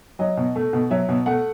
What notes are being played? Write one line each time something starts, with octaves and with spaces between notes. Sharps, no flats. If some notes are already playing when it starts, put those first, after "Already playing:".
F#3 D#5
B2
A3
B2
F#3 E5
B2
A3 F#5